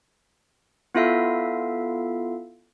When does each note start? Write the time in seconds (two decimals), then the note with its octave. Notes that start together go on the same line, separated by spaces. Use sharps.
0.95 B3 E4 F4 A4 E5 F5